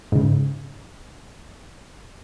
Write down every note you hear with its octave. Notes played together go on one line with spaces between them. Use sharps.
G#2 C#3